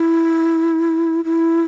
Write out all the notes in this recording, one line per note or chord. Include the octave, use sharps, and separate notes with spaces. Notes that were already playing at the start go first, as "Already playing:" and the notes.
Already playing: E4
E4